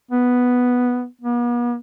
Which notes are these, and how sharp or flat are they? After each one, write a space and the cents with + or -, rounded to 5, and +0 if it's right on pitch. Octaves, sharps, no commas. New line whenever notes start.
B3 +0
B3 -45